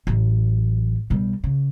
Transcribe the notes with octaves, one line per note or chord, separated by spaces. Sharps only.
A1 F#3
B1 G3
C#3